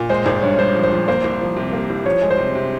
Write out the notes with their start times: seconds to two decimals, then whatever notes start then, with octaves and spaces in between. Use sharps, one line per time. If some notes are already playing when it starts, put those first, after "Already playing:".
Already playing: A#2
0.09 G#3 C5
0.26 G#1 C5
0.42 G2 C#5
0.58 G2 C5
0.75 F3
0.83 C5
0.92 F3
1.08 A#3 C5
1.24 C2
1.41 F3
1.56 C3
1.73 A#3
1.90 C2
2.06 F3 C#5
2.22 G#3
2.31 C5
2.38 C3
2.55 C3